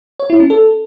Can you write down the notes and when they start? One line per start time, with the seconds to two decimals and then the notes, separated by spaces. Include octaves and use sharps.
0.20 C#5
0.30 E4
0.40 C#4
0.50 A4